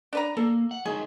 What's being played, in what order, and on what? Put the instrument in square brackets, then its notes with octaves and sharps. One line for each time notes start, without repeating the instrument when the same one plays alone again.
[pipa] D4 B4 A#5
[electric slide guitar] A#3 [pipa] A4
[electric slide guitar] F#5
[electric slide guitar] G#3 D#4 F#4 [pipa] G#4